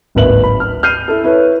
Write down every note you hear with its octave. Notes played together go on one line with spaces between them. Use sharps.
D1 G#1 A#3 B4 E5 F#7
B5
F6
F6 G6 C7 D#7
E4 A4
E4 B4 C#5